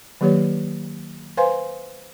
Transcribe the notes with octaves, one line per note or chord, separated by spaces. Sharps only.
D#3 F#3 A#3 G4 B4 C#5
B4 C5 F5 G#5 C6